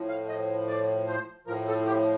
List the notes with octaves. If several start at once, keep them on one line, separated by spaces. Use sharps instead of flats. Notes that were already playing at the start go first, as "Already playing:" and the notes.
Already playing: A2 F3
F5
D#5
D5
C5
A2 F3 A#4
A4
G4